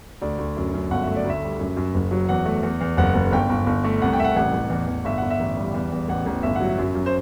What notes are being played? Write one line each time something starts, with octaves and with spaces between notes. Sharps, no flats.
D2 D5
D2
F#2
F#2
G1 F#5
A3 E5
D5
D2
E5
G3
F#2
F#2
F#1
F#3
E2 F#5
A3
E2
E2
F#1 F#5
F#1
G1 G5
G1
G1
A3
C2 F#5
G5
C2 E5
F#5
A1 F#5
A1
E2
E2
G1 E5
G1 F#5
E5
A1
G3
E2
E2
A1 F#5
A1
G1 E5
F#3 F#5
E5
F#2
F#2
C5